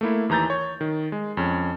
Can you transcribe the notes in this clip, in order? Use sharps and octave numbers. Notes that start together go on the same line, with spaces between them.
A3 A#3 E4
D#2 E3 A#5 G6 A6
C#5
D#3
G#3
F2 C#4